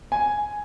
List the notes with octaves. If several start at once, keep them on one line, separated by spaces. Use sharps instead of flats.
G#5